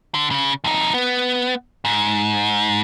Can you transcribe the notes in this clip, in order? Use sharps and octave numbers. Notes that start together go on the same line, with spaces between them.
D3
C#3
F2 D#4
B3
G#2